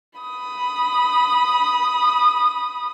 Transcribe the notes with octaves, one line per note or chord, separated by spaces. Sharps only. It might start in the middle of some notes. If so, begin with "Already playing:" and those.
B5 D#6